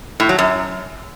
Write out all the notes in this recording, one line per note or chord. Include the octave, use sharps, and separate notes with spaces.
A2
F#3
F#2